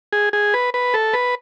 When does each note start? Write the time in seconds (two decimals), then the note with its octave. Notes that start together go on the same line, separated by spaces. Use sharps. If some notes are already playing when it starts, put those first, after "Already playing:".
0.13 G#4
0.33 G#4
0.54 B4
0.74 B4
0.94 A4
1.14 B4